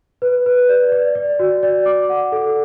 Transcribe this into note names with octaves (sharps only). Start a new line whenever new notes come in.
B4
B4
D5
D5
D5
F#4
D5
D6
F#5
A4